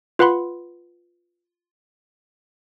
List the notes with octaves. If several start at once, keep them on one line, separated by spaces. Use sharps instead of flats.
F4 B4 F#5 B5 C6